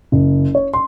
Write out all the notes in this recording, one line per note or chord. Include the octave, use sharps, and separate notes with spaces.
F#1
C#5
C6